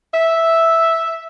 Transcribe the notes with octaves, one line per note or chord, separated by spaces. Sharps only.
E5